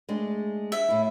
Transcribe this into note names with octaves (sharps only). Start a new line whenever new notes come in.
G#3 A3 D4
E5
A2 E4